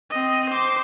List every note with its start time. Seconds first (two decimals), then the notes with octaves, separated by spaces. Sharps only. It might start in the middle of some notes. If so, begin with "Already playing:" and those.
0.11 C4 D#5
0.50 C5 D6